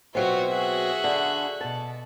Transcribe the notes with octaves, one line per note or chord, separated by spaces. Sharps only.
B2 F#3 C4 F4 F#4 E5
F#4 G#4 E5 F#6
D3
B2 A5